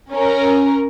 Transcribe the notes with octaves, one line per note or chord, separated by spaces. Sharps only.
C#4 A#4